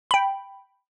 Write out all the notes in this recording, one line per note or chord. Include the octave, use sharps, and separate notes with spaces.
G5 B5